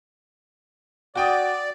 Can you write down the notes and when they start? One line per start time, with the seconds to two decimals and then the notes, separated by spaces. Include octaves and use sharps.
1.15 F#4 D5 G5 D#6